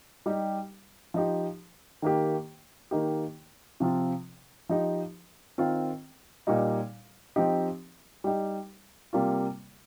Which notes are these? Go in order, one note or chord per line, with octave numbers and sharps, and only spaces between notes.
G3 D#4 G4
F3 D#4 G4
D#3 A#3 G4
D#3 A#3 D#4 G4
C3 F3 C4 F4
F3 D#4 G4
D#3 C4 F4
A#2 G3 D#4
F3 C4 D#4 G4
G3 D#4 G4
C3 G3 A#3 F4